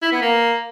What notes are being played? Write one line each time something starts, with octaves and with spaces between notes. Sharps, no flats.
E4
B3
A#3